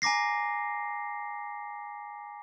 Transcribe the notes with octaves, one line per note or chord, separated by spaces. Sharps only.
G#5 A#5 D6 A#6 C7